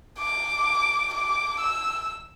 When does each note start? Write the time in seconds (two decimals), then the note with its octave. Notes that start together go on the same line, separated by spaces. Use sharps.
0.19 D6
1.13 D6
1.60 E6